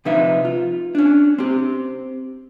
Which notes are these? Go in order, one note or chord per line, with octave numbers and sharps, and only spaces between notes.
C3 F3 D#4 B4 E5 F5
F4
C#4 D4
C4 G4